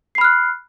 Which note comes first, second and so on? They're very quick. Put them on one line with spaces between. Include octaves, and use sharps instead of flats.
C7 B5 F6 F#6